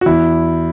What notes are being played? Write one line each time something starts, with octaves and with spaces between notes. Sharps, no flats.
F#4
E2 E4